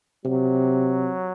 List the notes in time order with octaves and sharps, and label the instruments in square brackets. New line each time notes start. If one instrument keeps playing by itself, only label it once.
[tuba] C3 [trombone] F#3